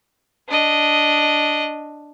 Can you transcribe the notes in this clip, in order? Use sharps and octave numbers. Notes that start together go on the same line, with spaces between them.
D4 D#5